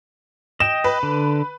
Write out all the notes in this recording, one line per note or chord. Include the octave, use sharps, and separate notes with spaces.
D#5 G5 E7
B4
D3